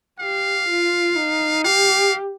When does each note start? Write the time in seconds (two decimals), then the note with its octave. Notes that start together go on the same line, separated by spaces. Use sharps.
0.20 G4 F5
0.69 F4
1.16 D#4
1.64 G4 F5